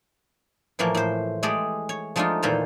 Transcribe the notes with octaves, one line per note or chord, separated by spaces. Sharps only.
A2 E3 F3 A3 A#3
A2 C5
G#3 A3 G4 G#4 D5
C#5
F3 G#3 A3 D4 D#4 F4
E2 A#2 D#3 A4 C5 A#5